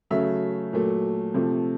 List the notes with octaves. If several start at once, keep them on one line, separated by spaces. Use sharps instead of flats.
C#3 F#3 A3 E5
A#2 F#3 A3
C3 F3 A3